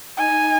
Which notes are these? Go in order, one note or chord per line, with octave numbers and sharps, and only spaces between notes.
D#4 G#5